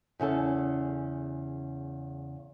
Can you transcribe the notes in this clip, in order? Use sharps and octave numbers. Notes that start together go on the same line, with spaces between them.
E2 C#3 C#4 A4